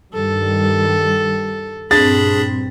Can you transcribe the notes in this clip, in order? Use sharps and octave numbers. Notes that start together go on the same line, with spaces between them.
G2 D#3 G3 A4
G2 A#2 C4 D4 G#4 B5 A6